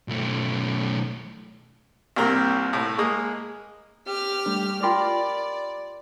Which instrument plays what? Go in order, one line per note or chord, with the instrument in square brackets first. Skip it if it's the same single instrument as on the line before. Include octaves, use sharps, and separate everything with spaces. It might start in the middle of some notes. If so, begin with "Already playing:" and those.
[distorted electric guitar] B1 A3
[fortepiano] C2 G2 A#2 C4 G4 A#4
C2 A2
G#3 A#3 D#6
[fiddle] G4 F6
[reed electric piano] G3 A3 D4
[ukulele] F4 G4 A#4 [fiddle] D5 [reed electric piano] B5 C6 D6